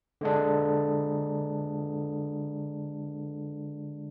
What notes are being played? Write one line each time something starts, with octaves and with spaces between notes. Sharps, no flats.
D3 G#3 D4